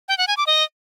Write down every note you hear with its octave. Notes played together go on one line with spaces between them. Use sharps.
G5
F#5
G#5
D6
D#5